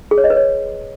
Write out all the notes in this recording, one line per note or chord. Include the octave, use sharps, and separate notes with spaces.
G#4
C#5
D#5
B4
C#5